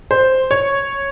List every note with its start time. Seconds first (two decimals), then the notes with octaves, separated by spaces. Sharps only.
0.11 C5
0.51 C#5